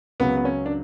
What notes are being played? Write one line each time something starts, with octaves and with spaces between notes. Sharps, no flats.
C#2 C#3 F#3 B3
B3
C#4
D4